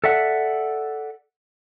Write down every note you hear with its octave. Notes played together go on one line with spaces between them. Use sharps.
A4 D5 E5 F#5